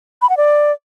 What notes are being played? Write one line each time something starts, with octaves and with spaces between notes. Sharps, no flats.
B5
F#5
D5